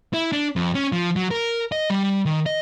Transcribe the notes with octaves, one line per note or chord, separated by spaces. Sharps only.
E4
D4
F2
C#4
F3
F#3
A#4
D#5
G3
D#3
D#5